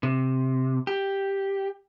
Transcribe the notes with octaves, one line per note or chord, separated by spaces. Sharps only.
C3
G4